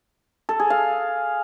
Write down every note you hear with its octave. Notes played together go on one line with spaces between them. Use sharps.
A4
G#4
F5